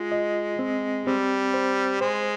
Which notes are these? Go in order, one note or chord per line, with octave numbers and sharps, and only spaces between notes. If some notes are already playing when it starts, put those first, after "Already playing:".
Already playing: G#3 F4
D#5
C4
G3 C4
C5
G#3 C5